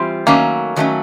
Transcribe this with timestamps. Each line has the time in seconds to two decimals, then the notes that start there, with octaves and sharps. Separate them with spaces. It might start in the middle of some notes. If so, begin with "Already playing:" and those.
Already playing: E3 G3 C4 F4
0.27 D#3 F#3 A3 A#3 C#4
0.76 D#3 F#3 A3 C#4